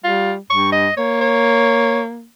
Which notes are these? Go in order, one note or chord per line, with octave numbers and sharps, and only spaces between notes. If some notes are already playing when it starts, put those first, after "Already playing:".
G3 F4
G2 C#6
D#5
A#3 C#5
C#5